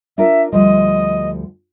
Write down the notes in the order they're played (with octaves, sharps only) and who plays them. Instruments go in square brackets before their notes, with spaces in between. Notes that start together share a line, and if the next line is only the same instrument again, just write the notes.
[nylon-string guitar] D4 F4 A#4 [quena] E5
[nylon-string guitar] D2 F3 G3 [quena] D#5